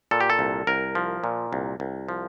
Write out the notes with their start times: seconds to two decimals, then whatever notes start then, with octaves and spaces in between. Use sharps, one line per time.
0.11 A#2 A4
0.20 G4
0.30 A4
0.39 C2
0.67 C2 A#4
0.95 F3
1.24 A#2
1.53 C2
1.80 C2
2.09 F3